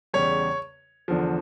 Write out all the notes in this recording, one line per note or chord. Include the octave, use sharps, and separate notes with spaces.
E2 C#3 G3 C#5
E2 D3 F3